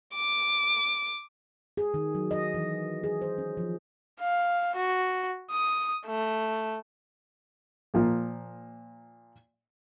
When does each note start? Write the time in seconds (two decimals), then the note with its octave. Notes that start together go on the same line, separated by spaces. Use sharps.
0.14 D6
1.77 G#4
1.94 D#3
2.15 F#3
2.31 D#5
2.54 E3
3.04 G#4
3.22 C5
3.38 C#4
3.57 F3
4.20 F5
4.75 F#4
5.51 D#6
6.06 A3
7.94 A#2 F3 A#3